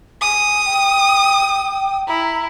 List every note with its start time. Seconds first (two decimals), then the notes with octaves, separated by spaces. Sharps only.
0.21 G#5 D#6
0.65 G5
2.07 E4 A#5